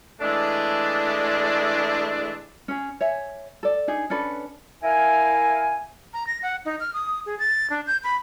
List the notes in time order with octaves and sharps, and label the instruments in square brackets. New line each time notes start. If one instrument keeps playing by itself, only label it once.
[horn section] E3 G#3 A3 D4
[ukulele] C#4 G#4
C#5 E5 G#5
A4 D5
D4 D#4 G#4
C#4 D4 A4 B4
[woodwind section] E4 A#4 F5 G#5
[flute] A#5
A#6
F#5
D#4
F6
D#6
G#4
A6
D4
G6
B5